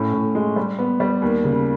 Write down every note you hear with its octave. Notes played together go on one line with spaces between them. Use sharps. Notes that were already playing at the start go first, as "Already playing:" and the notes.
Already playing: A2 C#4
A2
G#3
G3
B3
G3
D#2
C#3